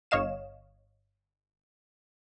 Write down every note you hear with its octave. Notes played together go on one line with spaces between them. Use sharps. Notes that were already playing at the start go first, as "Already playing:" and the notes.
G1 C#5 D#5 F5 E7